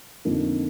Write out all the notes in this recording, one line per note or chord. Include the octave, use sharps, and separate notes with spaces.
F2 D3 F3 A#3 D#4